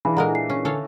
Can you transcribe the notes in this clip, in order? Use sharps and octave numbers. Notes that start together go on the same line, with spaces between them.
E3 D4 G#4 F5 B5
A#2 G#3 A4 A#4 F#5 A#5
C7
C#4
D3 A4 C#5 F5